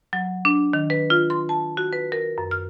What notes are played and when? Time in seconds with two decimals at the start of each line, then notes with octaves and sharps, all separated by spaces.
0.13 F#3
0.45 D4
0.73 D#3
0.90 B4
1.10 F4
1.30 C6
1.49 A5
1.77 F#4
1.93 B4
2.12 A#4
2.38 F#2
2.51 F6